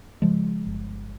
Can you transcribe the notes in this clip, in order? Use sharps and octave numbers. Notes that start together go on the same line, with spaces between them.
C#3 F3 G#3
G1